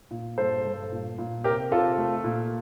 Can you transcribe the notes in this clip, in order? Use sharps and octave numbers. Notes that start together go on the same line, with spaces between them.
A#2
G2 A4 C5
G2
A#2
A#2
C3 G4 A#4
C3 F4 A4
A3
A#2